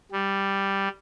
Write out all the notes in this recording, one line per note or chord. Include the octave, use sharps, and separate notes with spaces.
G3